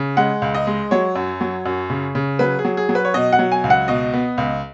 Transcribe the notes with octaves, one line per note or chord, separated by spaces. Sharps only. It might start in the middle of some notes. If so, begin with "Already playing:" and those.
Already playing: C#3
G#3 F#5
C#2
D#5
G#3
F#3 C#5
F#2
F#3
F#2
C#3
C#3
F#3 B4
G#4
F#3
G#4
F#3
B4
C#5
B2 D#5
F#5
F#3
G#5
C#2
F#5
B2 D#5
B3
C#2